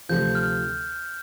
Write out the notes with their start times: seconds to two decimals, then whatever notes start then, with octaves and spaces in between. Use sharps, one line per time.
0.09 D2 C3 F3 G6
0.35 F6